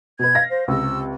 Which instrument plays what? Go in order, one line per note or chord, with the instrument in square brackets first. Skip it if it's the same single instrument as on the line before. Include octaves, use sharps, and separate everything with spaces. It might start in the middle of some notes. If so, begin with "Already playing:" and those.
[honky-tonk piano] B2 B4 [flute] G#6
[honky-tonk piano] F5 A#6
[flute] C5
[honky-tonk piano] C#2 C3 [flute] E6